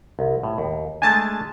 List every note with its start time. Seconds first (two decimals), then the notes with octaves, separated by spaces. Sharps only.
0.19 C2
0.43 A2
0.58 D#2
1.02 G#3 A3 D4 G#5 A5 A6